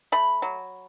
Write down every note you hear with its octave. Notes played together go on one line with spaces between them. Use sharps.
A3 B5
F#3